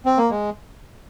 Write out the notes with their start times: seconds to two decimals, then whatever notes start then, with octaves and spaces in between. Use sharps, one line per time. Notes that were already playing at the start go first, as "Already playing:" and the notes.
0.06 C4
0.18 A#3
0.31 G#3